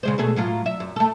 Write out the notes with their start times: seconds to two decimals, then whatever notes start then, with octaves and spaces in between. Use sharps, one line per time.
0.03 C#3 G#3 C5
0.18 B2 A3 G#4
0.36 A2 F#3 F4
0.66 E5
0.80 F#2
0.96 A3 A4